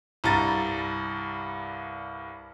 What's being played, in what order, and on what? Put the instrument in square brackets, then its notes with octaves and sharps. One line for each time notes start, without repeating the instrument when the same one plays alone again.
[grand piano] C2 G2 A#5 A6